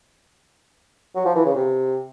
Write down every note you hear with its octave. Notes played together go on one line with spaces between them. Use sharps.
F#3
F3
E3
C#3
C3